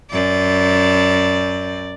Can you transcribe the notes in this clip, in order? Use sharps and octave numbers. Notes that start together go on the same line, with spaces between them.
F#2 D5